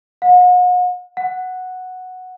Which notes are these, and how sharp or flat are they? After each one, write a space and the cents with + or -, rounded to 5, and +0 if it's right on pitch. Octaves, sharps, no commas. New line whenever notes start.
F#5 -40
F#5 -5